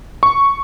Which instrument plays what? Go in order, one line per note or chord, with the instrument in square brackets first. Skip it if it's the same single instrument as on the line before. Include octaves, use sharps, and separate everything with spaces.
[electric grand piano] C#6